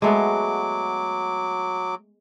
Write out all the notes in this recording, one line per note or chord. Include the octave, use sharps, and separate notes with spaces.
F#3 G#3 A3 B3 D6